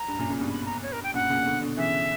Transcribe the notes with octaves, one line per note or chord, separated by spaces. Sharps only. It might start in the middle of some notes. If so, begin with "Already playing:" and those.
Already playing: A#5
G2
F#2 A#2
A#2 C#3
G2 B2
B5
A#5
C#5
A#4
G5
F#2 A#2 F#5
A#2 C#3
B2 D3
B2 D3
C#3 E3 E5